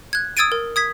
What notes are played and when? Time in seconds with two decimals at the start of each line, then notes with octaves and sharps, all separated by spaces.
0.13 F#6 G#6
0.37 D#6 E6 G#6 A6 D7 D#7
0.52 A#4
0.76 D#6 G#6 B6